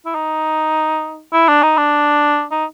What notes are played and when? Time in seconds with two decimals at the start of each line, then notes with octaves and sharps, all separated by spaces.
0.06 E4
0.15 D#4
1.33 E4
1.48 D4
1.63 D#4
1.77 D4
2.51 D#4